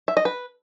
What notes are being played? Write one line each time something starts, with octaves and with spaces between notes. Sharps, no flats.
E5
D#5
B4